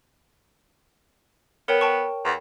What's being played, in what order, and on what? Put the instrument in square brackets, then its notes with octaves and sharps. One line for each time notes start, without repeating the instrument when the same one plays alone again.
[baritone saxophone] B3 [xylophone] A#4 C#5 G5
[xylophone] G5 A5 C#6
[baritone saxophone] E2